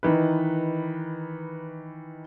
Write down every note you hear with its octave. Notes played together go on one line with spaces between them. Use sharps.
D#3 E3 D#4 B4